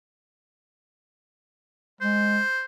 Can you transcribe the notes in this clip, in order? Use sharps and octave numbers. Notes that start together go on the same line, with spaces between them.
G#3 C5